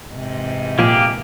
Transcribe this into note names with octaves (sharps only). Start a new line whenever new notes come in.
G#2 C3 E3
A#2 F3 A#3 F4 G4 G#4